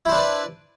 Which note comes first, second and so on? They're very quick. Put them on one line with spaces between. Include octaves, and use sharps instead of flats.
E4 C5 D4 B4 D5